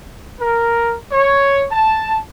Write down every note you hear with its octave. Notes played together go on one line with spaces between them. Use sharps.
A#4
C#5
A5